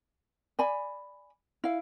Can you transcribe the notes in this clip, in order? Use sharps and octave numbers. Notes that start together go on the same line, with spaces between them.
D5 G#5 B5
E4 F5